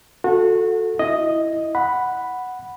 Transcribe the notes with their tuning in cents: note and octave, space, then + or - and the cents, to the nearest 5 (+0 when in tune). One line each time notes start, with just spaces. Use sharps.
F#4 -25 A4 +0
E4 +0 D#5 +0
F#5 +0 B5 +0